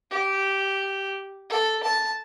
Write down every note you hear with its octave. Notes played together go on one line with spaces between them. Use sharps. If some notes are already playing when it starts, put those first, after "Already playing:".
G4
A4
A5